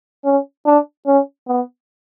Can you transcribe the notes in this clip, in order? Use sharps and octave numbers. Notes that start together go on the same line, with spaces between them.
C#4
D4
C#4
B3